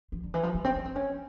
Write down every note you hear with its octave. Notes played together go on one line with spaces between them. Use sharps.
F3
D3
E3
F3
G3
C4
C#4
C4
C#4